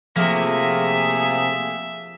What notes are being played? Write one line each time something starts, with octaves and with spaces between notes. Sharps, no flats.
C3 F3 A3 A#3 G#4 E5